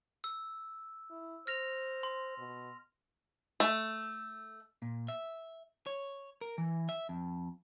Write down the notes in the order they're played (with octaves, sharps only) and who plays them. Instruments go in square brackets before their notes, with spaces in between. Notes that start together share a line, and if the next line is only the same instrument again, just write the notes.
[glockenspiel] E6
[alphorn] E4
[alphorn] C5 [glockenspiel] F6 A#6 F7
[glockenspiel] C6
[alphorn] B2
[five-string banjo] A3
[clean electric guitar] A#2
E5
C#5
A#4
E3
E5
F2